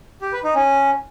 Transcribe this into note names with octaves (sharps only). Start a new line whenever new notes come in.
G4
B4
D#4
C#4